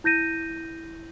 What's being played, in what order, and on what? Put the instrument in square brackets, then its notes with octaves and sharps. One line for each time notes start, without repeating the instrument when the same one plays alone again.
[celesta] E4 G6 A#6 D#7